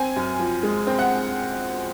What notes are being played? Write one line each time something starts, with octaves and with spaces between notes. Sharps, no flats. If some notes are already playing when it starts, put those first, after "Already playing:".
Already playing: C4 G#5
F#2
F3
G#3
C4
F#5